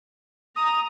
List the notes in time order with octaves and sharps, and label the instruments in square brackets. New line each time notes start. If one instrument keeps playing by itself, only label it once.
[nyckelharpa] A#5 [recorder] D#6